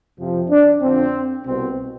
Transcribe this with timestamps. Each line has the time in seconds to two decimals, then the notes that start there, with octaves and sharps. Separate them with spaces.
0.18 F2 C3 F3
0.49 D4
0.81 F2 D3 F3 C4
1.45 C2 B2 C4